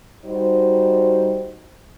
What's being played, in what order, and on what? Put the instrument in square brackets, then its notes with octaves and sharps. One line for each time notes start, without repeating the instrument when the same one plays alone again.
[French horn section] G3 D#4 F#4 C5